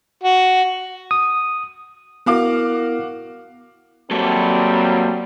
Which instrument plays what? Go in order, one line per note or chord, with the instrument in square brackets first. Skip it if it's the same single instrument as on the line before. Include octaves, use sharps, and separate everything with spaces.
[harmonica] F#4
[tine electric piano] D#6
[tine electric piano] B3 E4 A#4 [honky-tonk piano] F#4 F5 D6
[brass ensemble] F#3 G3 C4 [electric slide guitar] A#3 A4